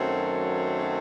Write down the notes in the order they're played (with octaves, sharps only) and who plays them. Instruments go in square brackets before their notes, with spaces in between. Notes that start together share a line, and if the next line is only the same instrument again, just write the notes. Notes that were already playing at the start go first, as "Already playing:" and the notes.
Already playing: [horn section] F#2 D#3 F#3 A3 C4